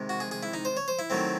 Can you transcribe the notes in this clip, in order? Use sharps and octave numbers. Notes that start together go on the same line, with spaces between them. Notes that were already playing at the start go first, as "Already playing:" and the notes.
Already playing: C3 D#3 G#3
F#4
G#4
G#4
E4
D#4
C5
C#5
C5
E4
D#3 F#3 A3 C4